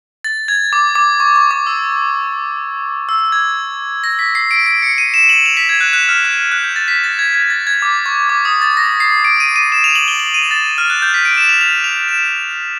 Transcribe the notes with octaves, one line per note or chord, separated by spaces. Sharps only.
A6
G#6
D6
D6
C#6
C#6
D6
E6
E6
G#6
A#6
B6
C7
D7
D7
C#7
D#7
E7
F#7
F7
B6
G#6
F#6
F#6
F6
F#6
F#6
G6
A6
B6
A6
G#6
G#6
A6
G#6
D6
C#6
D6
D#6
A6
A#6
C7
D7
D#7
D#7
E7
F7
F#7
G7
F#7
D#7
A6
F6
F#6
G6
B6
D7
E7
F7
F7
F7
E7